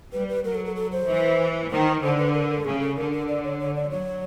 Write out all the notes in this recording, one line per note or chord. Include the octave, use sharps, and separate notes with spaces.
G3 B4
B4
F#3 A#4
A4
A4
A4
C5
E3
D#3 C5
D3 C5
B4
A#4
A4
C#3 G#4
A4
D3 A#4
A#4
D5
C#5
C#5
D5
F#3 C#5